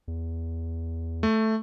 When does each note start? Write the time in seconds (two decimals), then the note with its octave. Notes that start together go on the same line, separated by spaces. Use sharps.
0.08 E2
1.23 A3